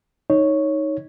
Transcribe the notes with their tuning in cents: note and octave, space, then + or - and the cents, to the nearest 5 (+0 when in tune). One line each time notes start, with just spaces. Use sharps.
D#4 +5 C#5 +0